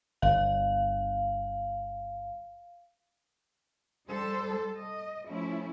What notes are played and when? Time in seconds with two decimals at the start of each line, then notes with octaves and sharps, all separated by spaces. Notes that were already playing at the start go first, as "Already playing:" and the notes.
0.22 G1 F5
4.09 G3 A4 C5
4.78 D#5
5.27 F3 A3 C#4 E4